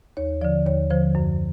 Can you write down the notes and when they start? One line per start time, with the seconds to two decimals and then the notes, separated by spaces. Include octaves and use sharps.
0.17 D#2 C#5
0.41 F3 D5
0.45 D3
0.66 D#2 C#5
0.90 D3 F3 C5
1.15 F#2